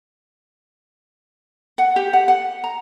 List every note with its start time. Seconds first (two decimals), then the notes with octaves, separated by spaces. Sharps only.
1.78 F#5
1.96 G4
2.13 F#5
2.28 F#5
2.64 A#5